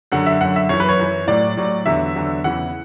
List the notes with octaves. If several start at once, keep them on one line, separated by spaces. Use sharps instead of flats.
F#2 D3 F#3 F#5
E5
F#2 D3 F#3 F#5
E5
F#2 E3 C#5
B4
C#5
F#2 E3
A2 F#3 D5
A2 F#3
E2 D3 F#3 E5
E2 D3 F#3
E2 C#3 E3 F#5